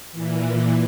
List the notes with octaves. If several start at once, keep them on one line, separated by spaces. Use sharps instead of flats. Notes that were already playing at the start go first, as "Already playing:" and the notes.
A#2 E3